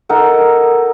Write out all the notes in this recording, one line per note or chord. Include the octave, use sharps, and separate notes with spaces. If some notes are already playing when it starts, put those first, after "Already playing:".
D#4 A4 A#4 F#5